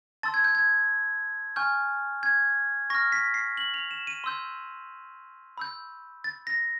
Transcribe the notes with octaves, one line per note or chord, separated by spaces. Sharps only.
A5 C6 E6 A6
G#6
G6
G#6
G#5 C#6 F6 G6
G#6
C#6 F6 A#6
B6
C7
F#7
F7
E7
D#7
C6 E6 G6
B5 E6 G6
A6
A#6